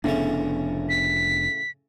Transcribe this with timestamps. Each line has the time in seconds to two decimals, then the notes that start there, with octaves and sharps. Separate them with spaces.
0.04 F1 A2 C#3 B3 C#4 D4
0.89 B6